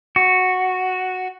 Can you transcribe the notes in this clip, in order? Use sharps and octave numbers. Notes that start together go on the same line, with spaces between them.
F#4